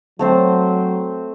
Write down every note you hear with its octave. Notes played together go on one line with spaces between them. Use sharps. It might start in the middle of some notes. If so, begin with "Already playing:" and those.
F#3 A3 C4 C5